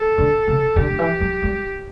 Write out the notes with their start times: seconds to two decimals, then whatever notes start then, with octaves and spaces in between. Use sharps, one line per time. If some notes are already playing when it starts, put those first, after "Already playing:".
Already playing: A4
0.18 D3
0.48 C#3
0.76 D3 G4
0.90 D3
0.99 E3
1.20 F#3
1.42 G3